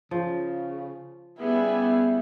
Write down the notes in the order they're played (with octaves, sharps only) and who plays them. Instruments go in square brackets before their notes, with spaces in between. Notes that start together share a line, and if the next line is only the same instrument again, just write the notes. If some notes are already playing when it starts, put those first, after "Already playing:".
[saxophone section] C#3 [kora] F3
[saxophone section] C#3 G#4 [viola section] G3 B3 [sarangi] E4